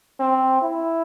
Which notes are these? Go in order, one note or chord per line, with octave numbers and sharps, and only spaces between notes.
C4
E4